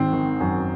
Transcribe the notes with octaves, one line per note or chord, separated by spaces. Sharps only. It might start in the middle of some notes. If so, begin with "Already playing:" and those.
Already playing: G#1 G#2 C4
D#3
F#2